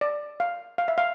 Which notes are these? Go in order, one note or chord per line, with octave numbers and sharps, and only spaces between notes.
D5
F5
F5
E5
F5